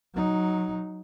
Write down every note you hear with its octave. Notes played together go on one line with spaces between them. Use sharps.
F#3 D#4